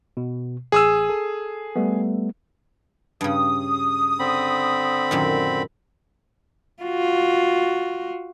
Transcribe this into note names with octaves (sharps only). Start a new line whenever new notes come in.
B2
A1 G#4 D#6 E6
A4
G3 A3 B3
G2 C#3 D#6
D3 C4 B5
F#2 A#2 D#3
F4 F#4